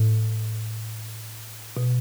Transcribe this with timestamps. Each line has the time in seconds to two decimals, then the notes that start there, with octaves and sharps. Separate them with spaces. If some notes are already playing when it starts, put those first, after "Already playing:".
Already playing: A2
1.77 B2